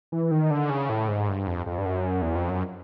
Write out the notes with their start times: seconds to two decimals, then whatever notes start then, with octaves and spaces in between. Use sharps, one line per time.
0.12 E3
0.31 D#3
0.51 D3
0.70 C#3
0.90 A2
1.08 G#2
1.28 G2
1.47 F2
1.66 F2
1.78 G2
1.86 F#2
2.22 E2
2.35 F2
2.50 F#2